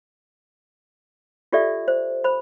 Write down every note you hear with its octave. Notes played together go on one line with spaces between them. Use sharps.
F4 G4 A4 D5 E5
C5
C5 B5